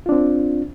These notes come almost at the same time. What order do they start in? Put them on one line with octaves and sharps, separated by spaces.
F4 D4 C4